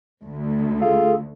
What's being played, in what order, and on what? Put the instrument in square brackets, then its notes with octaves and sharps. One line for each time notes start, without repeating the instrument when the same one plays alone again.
[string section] D2
[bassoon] F4 [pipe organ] G#4 A4